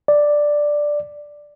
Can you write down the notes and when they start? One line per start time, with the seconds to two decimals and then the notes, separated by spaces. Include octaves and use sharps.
0.08 D5